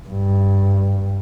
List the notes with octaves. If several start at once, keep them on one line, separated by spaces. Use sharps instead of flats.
G2